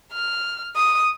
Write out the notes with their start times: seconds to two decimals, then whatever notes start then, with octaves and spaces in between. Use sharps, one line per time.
0.13 F6
0.76 D#6